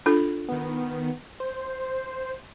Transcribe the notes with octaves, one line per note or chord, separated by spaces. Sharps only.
D4 F4 A4
D#3 B3
C5